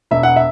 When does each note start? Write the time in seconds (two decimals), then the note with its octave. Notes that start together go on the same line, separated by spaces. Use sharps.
0.11 E1 E5
0.23 F#5
0.36 E5